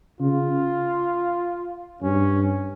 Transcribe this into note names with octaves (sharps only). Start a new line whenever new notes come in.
C#3 F4
G2 C#4